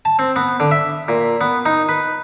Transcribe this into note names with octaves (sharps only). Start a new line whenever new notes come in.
A5
C4
B3
D3
E5
A#2
B3
D#4
B4